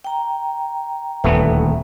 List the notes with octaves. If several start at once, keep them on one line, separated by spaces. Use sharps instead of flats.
G5 A#5
D#1 D2 E3 A3 B3